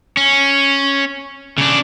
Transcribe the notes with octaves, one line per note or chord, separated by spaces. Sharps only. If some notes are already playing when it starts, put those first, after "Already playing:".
C#4
C#3 D4